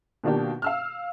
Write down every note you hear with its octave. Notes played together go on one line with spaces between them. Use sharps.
B2 D#3 A#3 D4 F4 G4
F5 E6 F6